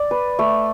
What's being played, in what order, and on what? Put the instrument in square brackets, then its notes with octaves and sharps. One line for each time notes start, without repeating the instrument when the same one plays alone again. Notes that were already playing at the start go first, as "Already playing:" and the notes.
Already playing: [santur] D5
B4
A3